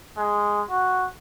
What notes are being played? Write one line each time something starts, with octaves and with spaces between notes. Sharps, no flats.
G#3
F#4